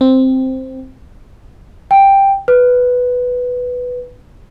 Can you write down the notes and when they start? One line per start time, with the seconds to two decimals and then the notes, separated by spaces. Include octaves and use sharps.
0.01 C4
1.91 G5
2.48 B4